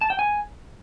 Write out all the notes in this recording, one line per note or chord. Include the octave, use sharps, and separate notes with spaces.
A5
G5
G#5